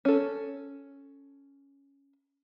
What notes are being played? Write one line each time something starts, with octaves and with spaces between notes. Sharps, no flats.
C#4 A4